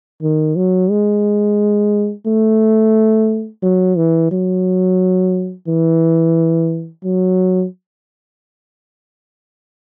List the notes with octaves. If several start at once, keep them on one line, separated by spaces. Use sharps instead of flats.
D#3
F#3
G#3
A3
F#3
E3
F#3
E3
F#3